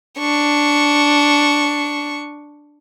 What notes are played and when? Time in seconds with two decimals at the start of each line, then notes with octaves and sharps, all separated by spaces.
0.19 D4 C#6